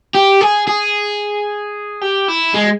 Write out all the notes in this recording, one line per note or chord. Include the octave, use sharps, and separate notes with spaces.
G4
G#4
G#4
G4
E4
G#3